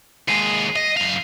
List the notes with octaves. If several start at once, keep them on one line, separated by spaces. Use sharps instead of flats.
D#2 G#3 C7 D#7
D#5
F#2 F5